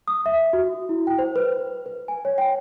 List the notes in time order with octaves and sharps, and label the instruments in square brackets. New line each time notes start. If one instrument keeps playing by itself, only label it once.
[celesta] D#6
E5
F#4
E4
G5
C5
B4
B4
G#5
C#5
G5